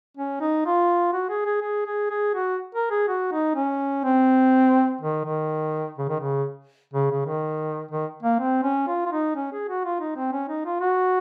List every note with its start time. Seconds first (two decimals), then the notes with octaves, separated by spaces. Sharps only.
0.17 C#4
0.41 D#4
0.66 F4
1.13 F#4
1.30 G#4
1.46 G#4
1.62 G#4
1.86 G#4
2.10 G#4
2.35 F#4
2.75 A#4
2.91 G#4
3.08 F#4
3.32 D#4
3.56 C#4
4.04 C4
5.01 D#3
5.25 D#3
5.98 C#3
6.09 D#3
6.20 C#3
6.94 C#3
7.11 C#3
7.26 D#3
7.91 D#3
8.23 A#3
8.40 C4
8.63 C#4
8.88 F4
9.06 F4
9.12 D#4
9.36 C#4
9.52 G#4
9.68 F#4
9.85 F4
10.00 D#4
10.16 C4
10.32 C#4
10.49 D#4
10.66 F4
10.81 F#4